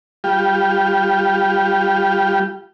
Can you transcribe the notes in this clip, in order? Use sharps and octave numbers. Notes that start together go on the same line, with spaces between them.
G3 F4 G4